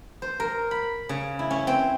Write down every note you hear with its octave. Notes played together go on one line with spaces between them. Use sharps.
C5
A#4
B5
C#3
E4
C#4
C4